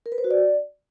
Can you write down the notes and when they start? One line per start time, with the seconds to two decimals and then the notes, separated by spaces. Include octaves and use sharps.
0.06 A#4
0.12 B4
0.18 C5
0.24 F#4
0.31 D5